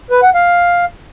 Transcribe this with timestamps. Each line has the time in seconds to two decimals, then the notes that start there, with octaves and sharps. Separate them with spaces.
0.11 B4
0.23 F#5
0.35 F5